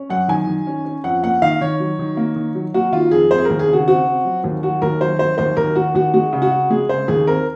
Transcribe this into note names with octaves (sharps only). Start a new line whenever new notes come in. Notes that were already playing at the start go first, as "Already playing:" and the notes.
Already playing: C#4
F#2 F#5
D#3 G#5
D#3
C#4
C#4
F2 F#5
A#3 F#5
D#3 F5
D#3 C#5
F#3
D#3
A#3
D#3
F#3
A#3 F#4
D#3 F4
F2 G#4
C4 C5
G#4
D#2 A#4
G#4
C#3
F#4
C4 F#4
C4
F#3
D#2
F#3 F#4
D#2 A#4
F#3 C5
F#3 C5
D#2 C5
D#2 A#4
D#2 F#4
D#2 F#4
G#3 F#4
C#3
F#4
C#3
G#3 G#4
C#3 C5
D#2 G#4
C4 A#4